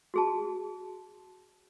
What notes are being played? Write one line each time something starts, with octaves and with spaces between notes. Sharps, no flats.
F#4 G#4 A5